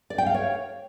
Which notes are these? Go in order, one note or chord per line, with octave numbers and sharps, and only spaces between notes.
D5
G5
F5
C#5